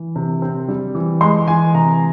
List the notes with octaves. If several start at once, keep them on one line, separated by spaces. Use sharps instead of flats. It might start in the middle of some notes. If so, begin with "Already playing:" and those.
Already playing: E3
C3
C4
G3
E3
G#3 C6
E3 G#5
C3 A#5